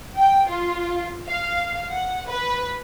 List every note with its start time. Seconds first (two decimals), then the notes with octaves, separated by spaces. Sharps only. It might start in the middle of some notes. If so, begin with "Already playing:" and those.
0.17 G5
0.48 F4
1.28 F5
1.90 F#5
2.30 B4